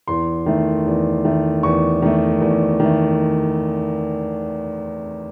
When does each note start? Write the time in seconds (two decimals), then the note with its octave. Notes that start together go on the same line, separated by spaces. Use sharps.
0.08 E2 C6
0.46 D#3 A3
0.86 E2
1.25 D#3 A3
1.63 E2 C#6
2.02 D#3 A3
2.41 E2
2.80 D#3 A3